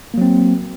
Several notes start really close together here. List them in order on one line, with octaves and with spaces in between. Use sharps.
A#3 F#3 C4